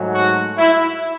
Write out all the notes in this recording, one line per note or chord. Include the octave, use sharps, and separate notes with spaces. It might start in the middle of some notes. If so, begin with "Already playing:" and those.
Already playing: G#2 F#3 A3
F#4
E4